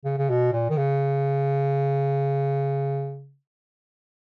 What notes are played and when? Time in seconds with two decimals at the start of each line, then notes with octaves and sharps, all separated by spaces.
0.05 C#3
0.18 C#3
0.30 B2
0.53 A#2
0.70 D#3
0.77 C#3